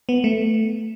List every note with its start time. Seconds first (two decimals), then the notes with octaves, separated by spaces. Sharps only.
0.09 B3
0.24 A3